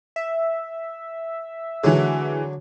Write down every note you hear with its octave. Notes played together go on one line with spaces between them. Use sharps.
E5
D3 E3 F#3 G#3